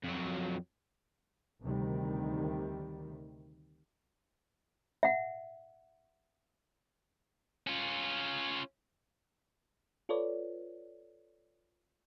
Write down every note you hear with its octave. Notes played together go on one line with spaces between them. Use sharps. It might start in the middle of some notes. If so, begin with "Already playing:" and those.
F2 F#3
D2 C3 D#3 G3
E5 F#5
C#4 F4
F4 A4 B4 C#5 D5